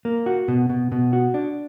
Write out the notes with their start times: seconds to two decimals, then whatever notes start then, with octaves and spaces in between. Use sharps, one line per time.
0.05 A#3
0.26 F#4
0.48 B2
0.70 B2
0.92 B2
1.13 F#4
1.34 D4